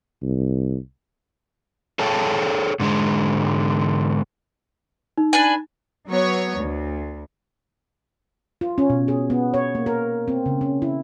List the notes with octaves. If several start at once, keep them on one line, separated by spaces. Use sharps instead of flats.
C2
G#4 A4 C#5 F5 G5 A5
G#2 D3 G#3
D#4
D4 B4 G#5
F#3 B3 C#5
D2
F4
C#4
B2
G#4
B3
C#5
A#3
A#4
C4
C#3
C#4
E4